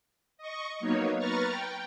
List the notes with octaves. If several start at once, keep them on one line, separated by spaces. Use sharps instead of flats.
D#5 C#6
F#3 A#3 B3 D#4 C#5
B4 A#5 C#6 F6 A6
G5